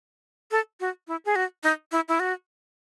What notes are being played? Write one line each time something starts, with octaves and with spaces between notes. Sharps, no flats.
A4
F#4
E4
G#4
F#4
D#4
E4
E4
F#4